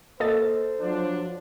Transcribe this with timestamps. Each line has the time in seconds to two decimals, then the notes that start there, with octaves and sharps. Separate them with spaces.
0.20 A#3 A4 C5 D#5 A6
0.80 F3 F#3 D4